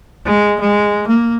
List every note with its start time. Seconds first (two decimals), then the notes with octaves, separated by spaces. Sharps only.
0.25 G#3
0.60 G#3
1.07 A#3